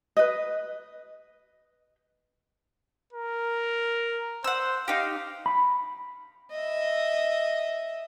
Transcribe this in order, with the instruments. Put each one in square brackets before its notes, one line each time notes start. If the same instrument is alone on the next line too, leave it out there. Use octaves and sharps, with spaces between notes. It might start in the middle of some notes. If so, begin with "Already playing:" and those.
[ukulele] B4 D#5
[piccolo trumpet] A#4
[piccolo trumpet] C5 [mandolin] F#5 E6
[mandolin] D#4 G4 [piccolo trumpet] F5
[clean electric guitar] B5
[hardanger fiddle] D#5 E5